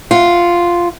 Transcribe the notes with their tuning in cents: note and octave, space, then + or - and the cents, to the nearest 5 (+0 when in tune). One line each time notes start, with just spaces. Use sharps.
F4 -5 F#5 +0